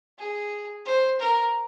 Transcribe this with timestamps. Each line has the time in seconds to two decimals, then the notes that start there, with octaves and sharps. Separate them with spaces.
0.19 G#4
0.86 C5
1.20 A#4